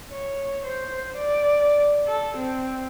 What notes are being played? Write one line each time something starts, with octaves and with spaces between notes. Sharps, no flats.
C#5
C5
D5
A4
C4